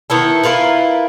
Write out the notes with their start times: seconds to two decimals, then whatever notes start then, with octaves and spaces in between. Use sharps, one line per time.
0.10 D#3 B3 E4 A4
0.43 E4 F4 A#4 B4